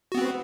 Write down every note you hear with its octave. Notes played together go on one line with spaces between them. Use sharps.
B3 C4 F#4